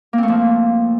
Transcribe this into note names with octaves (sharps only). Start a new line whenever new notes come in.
F3 A3 A#3 C4